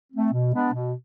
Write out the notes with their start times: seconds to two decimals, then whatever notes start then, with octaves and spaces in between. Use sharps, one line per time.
0.13 A3 C4
0.32 B2
0.53 G#3 B3 D4
0.73 B2